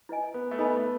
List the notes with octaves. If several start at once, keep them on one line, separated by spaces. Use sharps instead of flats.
E4 B4 D#5 G#5
B3
A3
B3 D#4 A4 D#5 G#5 B5
A3